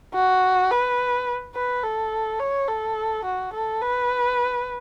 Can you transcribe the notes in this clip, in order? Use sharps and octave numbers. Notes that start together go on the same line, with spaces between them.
F#4
B4
B4
A4
C#5
A4
F#4
A4
B4